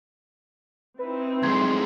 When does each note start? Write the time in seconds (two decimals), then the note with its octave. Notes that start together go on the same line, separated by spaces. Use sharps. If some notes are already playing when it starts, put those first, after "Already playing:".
0.99 C4 D#4 E4 B4
1.43 D2 F#3 G#3 A#5 C6 G#6